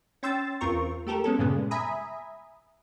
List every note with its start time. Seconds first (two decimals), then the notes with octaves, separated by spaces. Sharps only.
0.23 C#4 G5 C6 E6 A6
0.61 E2 C4 F4 A#4 C#6
1.07 A3 G4 A4 A#4
1.24 G#3 B3 C#4 A4
1.38 G2 A#2 C#3 G#3 B3
1.71 E5 G#5 A#5 B5 D#6